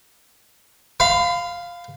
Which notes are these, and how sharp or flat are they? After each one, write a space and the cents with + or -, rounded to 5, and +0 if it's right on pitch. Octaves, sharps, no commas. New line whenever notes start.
F5 +0 B5 +40